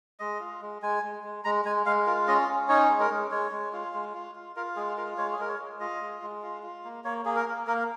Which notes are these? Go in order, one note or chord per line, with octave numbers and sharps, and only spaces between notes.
G#3 D#5
F4
G#3
G#3 G#5
G#3
G#3
G#3 A#5
G#3 G#5
G#3 F5
F4 A#4
C#4 D#5
C#4
D#4 C#5
G#3
A#4
G#3
G#3 C#5
G#3
F4
G#3
F4
F4
F4 A#4
G#3 G#4
F4 A#4
G#3 C#5
G#4
G#3 A#4
C#5
G#3
F4 D#5
G#3
G#3
F4
F4
A#3
A#3 C#5
A#3 G#4
A#4
A#3
A#3 A#4